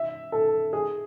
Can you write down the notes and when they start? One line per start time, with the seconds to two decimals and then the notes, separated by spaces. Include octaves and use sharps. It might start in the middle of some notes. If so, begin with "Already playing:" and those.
Already playing: E5
0.32 A4
0.73 G#4